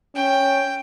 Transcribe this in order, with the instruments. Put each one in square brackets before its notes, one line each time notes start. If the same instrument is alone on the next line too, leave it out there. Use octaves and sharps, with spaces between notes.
[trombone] C#4 [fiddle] G5